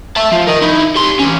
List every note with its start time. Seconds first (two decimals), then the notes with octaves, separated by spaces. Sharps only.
0.17 E5 A5
0.32 F3 F4
0.47 A#4 D#5
0.62 D#4 E4
0.95 G3 C6
1.19 E3 C#4